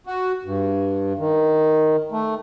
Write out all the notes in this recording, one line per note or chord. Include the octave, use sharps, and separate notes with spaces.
F#4
G2
D#3
A3